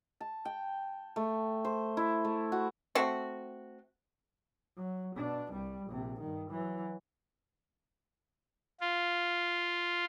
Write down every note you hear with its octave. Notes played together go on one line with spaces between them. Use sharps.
A5
G5
A3
C5
E4
A3
F#4
A3 C4 F#4
F#3
B2 D4
C2 G3
A#1 C3
G2 D#3
E3 F#3
F4